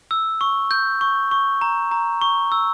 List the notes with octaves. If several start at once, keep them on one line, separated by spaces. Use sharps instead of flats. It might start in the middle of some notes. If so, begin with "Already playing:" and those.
E6
C#6
G6
C#6
C#6
A#5
A#5
C#6
E6